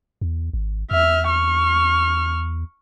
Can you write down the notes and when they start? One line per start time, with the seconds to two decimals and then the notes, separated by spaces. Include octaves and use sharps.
0.21 E2
0.53 G#1
0.91 E2 E5 F6
1.30 C#6 F6